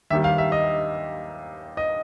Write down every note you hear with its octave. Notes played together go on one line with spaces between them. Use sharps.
D#2 D#3 G3 E5
F5
E5
D#5
D#5